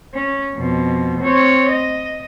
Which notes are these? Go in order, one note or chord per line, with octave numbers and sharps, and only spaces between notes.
C#4
F2 B2
C4 C#5
D#5